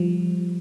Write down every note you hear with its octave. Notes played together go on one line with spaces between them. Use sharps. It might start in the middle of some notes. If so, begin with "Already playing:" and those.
Already playing: F3 G3